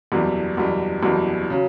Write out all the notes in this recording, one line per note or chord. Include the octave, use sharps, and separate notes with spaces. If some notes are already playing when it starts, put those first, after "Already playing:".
F#1 E2 B2 G3
F#1 E2 B2 G3
F#1 E2 B2 G3
C#3 F#3